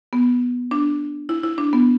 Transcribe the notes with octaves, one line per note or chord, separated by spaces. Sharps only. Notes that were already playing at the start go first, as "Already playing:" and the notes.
B3
D4
E4
E4
D4
B3